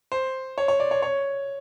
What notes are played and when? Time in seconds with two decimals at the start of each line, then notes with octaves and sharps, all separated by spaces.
0.12 C5
0.58 C#5
0.68 C#5
0.80 D5
0.91 C#5
1.02 C#5